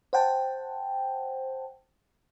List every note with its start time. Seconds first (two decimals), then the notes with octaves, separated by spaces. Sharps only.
0.13 C5 F#5 G5 A5